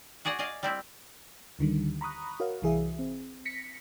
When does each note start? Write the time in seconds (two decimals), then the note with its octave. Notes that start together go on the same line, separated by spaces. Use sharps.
0.25 F#4 G#4 D5 F#5
0.39 G#4 D5 D#5 F5
0.63 G3 C4 E4
1.59 D2 D3 D#3 G3
2.01 A#5 B5 C#6 D#6 F#6
2.40 F#4 A#4 C#5 F5
2.62 C2 E3 G#4 E5
2.99 C4
3.45 A#6 B6 C#7